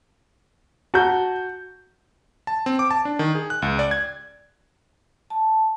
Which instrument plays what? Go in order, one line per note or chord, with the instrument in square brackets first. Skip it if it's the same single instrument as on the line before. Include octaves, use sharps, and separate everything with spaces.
[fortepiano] F#4 [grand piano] A5 A#5 G6
[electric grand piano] A5
C4
D6
A5
D4
D#3
G#4
F#6
C#2
D5
G#6
[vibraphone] A5